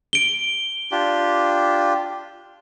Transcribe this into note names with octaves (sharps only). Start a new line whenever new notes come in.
D7 G7
D4 F4 G4